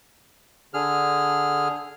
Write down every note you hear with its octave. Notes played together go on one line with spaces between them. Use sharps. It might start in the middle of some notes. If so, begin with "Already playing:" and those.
D3 G#4 F6